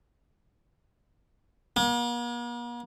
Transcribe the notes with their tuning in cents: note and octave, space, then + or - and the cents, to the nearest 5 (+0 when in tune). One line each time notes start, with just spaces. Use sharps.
A#3 +45